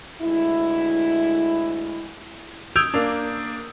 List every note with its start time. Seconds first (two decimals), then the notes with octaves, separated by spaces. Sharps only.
0.21 D2 G#3 E4
2.76 D#6 E6 G6 G#6 D7 F7
2.94 A#3 D4